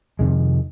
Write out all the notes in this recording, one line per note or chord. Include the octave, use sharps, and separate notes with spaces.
F2 C3 D#3 G#3